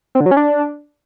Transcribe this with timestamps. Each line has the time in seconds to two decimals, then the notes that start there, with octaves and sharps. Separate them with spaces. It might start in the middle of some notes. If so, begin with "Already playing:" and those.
0.15 C4
0.20 D3
0.26 F#3
0.31 C#4
0.37 D4